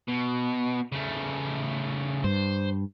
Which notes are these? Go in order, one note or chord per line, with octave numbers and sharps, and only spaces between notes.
B2
C#3 A3
G2 C5